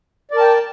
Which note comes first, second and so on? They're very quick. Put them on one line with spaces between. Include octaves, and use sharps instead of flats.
D5 A#4 A5 G5